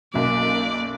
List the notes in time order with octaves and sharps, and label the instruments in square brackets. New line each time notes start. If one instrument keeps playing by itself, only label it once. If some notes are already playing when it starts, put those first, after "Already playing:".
[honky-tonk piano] B1 F#2 F#3 [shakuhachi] A#3 [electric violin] D5